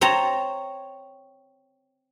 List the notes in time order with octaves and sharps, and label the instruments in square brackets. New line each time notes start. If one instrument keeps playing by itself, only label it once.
[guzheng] C4 C#5 A5 A#5